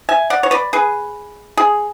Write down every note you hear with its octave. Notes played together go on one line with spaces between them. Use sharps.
E5 G#5
D5 F#5
C#5
B4 D5
G#4 B4
G#4